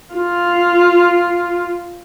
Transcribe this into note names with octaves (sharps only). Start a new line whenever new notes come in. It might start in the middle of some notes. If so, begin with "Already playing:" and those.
F4